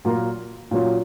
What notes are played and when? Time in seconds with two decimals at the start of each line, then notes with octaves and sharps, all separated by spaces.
0.05 A#2 F#3 A#3 F4 A#4
0.71 A#2 F#3 C#4 F4